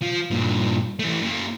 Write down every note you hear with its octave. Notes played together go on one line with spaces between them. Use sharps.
F3
G2 A#2
E3 A3
F#2 A#3